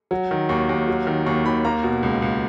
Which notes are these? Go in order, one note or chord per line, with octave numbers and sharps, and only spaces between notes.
F#3
D#3
D#2 C#6
D#2
F#3
D#3
D#2 C#6
D#2 B5
A#3 A#5
B2
C#2
C#2